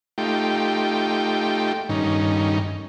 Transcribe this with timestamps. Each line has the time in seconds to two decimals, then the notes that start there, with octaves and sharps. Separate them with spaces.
0.18 A3 D#4 F4 G4 G5
1.89 G2 D#3 C#4 D#4